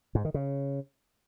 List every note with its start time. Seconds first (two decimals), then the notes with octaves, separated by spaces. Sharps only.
0.15 G#2
0.25 D#3
0.34 C#3